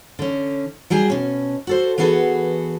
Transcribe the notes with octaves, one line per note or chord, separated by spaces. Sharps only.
D3 C#4
F#3 G3 G4 G#4
B2 C#4
F#4 A4 C5
E3 B3 F#4 G#4 A4 B4